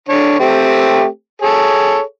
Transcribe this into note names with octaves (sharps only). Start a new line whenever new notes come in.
D3 D4 C#5
A3 C4 G4
G#4 A4 C#5